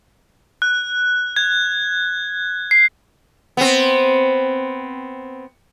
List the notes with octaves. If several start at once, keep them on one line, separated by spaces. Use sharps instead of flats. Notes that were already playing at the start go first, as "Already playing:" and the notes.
F#6
G#6
C7
B3 C4